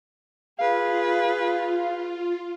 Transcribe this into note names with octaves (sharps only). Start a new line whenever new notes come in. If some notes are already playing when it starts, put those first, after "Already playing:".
F4 G#4 B4 F5